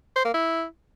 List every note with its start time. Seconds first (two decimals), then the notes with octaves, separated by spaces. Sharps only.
0.16 C5
0.25 A#3
0.34 E4